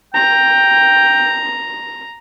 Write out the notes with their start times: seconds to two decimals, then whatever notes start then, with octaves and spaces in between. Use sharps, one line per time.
0.14 G5 A#5